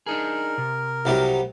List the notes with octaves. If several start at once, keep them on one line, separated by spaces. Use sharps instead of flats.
D4 D#4 G#4 A#4
C3
C2 F#3 G3